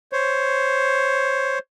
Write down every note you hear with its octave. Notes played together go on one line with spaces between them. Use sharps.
C5 C#5